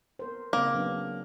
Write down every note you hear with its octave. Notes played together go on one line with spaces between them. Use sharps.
B3 A#4 C5
C#3 A#3 C4
F#3 B3 D4